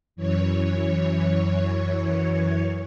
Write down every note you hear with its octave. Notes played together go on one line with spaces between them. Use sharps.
F#2 E3 C#5